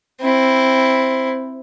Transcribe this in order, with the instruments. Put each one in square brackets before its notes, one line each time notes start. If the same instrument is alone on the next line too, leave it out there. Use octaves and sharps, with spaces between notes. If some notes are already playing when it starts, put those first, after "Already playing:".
[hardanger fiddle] C4 E4